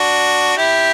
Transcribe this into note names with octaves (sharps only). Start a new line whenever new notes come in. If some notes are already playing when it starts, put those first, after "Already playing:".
Already playing: D4 F#4
E4 G4